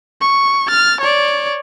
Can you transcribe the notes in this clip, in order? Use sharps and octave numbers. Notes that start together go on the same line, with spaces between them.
C#6
F6 A6
C#5 D5